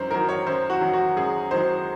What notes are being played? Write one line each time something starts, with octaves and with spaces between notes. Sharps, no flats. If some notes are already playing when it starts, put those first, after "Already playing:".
Already playing: F#2 D#3 F#3 A#4 C5
D#3 F#3 A#4
C#5
F#2 C5
F#4
D#3 F#3
F#4
F#2 G#4
D#3 F#3 C5